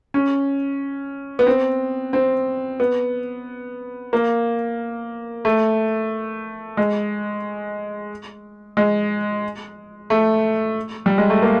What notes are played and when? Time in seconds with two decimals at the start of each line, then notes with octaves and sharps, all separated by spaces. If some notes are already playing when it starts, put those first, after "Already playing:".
0.14 C#4
1.39 B3
1.47 C4
2.13 C4
2.80 B3
4.13 A#3
5.45 A3
6.77 G#3
8.77 G#3
10.10 A3
11.06 G3
11.18 G#3
11.30 A3
11.42 A#3